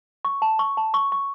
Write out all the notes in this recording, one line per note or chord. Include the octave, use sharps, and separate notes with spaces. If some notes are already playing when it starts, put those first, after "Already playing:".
C#6
A5
C#6
A5
C#6
C#6